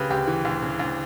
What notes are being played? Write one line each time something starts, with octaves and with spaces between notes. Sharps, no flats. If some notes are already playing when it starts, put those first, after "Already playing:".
Already playing: D2 C#3 G4 B4
D2 G4
E3
D2
C#3
D2